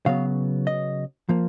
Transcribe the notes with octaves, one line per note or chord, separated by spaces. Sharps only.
C#3 F#3 B3 F5
D#5
F3 A#3